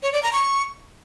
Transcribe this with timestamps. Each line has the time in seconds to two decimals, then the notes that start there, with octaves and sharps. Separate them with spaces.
0.03 C#5
0.13 D5
0.23 A#5
0.33 C#6